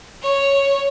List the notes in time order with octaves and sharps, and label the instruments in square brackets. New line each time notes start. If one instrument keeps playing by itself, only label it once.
[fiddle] C#5